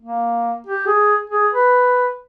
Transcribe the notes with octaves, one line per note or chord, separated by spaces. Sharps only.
A#3
G4
G#4
G#4
B4